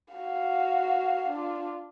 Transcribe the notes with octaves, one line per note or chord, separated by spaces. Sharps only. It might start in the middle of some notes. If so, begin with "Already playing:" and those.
F#4 F5
D4 F4